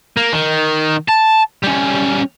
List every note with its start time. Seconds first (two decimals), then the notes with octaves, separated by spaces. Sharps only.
0.17 A#3
0.33 D#3
1.09 A5
1.63 G3 C#4